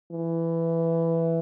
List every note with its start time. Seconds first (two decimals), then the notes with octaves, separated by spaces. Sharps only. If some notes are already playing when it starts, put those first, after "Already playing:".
0.12 E3